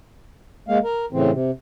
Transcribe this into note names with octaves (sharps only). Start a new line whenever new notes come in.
G#3 A#3 F5
A#4
A2 C#3 E3 C4
C3